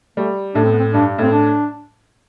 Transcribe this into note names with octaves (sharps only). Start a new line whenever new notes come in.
G3 A3
A2 D4
C4
B3
C4
G2 D4
A2 C4
D4